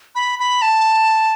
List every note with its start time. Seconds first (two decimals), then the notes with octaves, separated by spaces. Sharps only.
0.15 B5
0.39 B5
0.62 A5